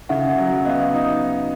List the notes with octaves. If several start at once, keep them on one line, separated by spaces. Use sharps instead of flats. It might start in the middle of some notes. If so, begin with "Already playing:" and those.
C#3 E5 F#5
F#3
B3 D#5 F5
D#4